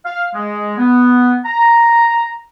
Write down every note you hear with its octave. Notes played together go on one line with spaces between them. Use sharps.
F5
G#3
B3
A#5